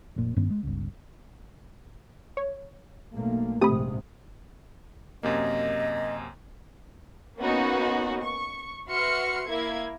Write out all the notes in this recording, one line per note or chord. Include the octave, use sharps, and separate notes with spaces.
F1 A#2
G2 D#3 B3 C#4
G#3
G1 C#2
C#5
B1 A3 A#3
A#1 G#2 C3 A3 C4 G4 B5 D#6
F#2 C3 A#3 D#5
A#3 B3 C#4 D#4 F#4
C#6
F#4 B4 E5 C6 F6 C#7
A#3 E4 G#6